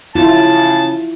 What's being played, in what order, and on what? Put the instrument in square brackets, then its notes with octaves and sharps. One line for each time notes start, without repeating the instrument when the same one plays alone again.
[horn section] C#3 A5 [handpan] E4 F4